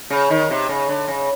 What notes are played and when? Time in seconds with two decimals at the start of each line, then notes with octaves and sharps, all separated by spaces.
0.10 C#3
0.30 D#3
0.50 C3
0.69 C#3
0.89 D3
1.08 C#3